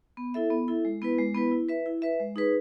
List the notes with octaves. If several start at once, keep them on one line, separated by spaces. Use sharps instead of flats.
B3
E4 A4 E5
B3
E4 A4 E5
G#3
B3 E4 B4
G#3
B3 E4 B4
E4
B4 E5
E4
B4 E5
G#3
D#4 G#4 B4